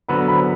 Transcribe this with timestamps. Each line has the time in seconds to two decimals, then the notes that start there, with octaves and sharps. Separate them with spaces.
0.09 D3 F#3 B3 B5
0.28 B5